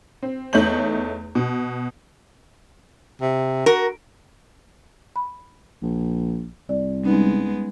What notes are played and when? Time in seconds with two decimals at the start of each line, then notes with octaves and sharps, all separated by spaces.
0.23 C4
0.53 E2 A3 D#4 C#5 G6 F#7
1.35 B2
3.21 C3
3.66 F#4 A#4
5.16 B5
5.82 A#1
6.69 C2 D5
7.04 G3 G#3 B3 C#4 D#4